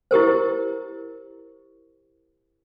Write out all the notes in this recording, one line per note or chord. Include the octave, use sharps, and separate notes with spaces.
E4 G4 A#4 C5